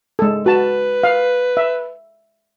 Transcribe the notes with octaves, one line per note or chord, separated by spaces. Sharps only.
G#3 A4
F#4 B4 A5
F5
E5